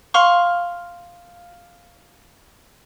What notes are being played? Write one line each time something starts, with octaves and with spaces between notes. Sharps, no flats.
F5 C6 C#6